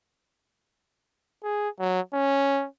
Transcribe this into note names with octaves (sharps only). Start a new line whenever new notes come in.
G#4
F#3
C#4